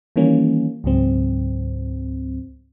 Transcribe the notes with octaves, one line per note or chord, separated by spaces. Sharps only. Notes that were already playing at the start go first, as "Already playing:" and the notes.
D#3 E3 G3 A#3 C#4
C#2 G#2 F#3 C4